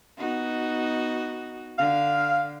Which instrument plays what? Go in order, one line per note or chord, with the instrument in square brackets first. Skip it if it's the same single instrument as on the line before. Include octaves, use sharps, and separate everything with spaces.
[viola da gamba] B3 D#4 F#4
[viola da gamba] D3 [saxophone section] F5